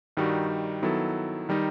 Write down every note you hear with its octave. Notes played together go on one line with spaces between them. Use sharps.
G2 D#3 G3 D#4 F#4
D#3 F#3 B3 E4 A4
D#3 G3 D#4